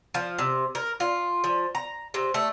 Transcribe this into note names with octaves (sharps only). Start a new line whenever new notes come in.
F3
C3
A#4
F4
F3
A#5
C3
A3